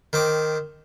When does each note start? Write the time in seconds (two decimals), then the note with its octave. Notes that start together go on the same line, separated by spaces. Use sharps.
0.13 D#3 C4 D6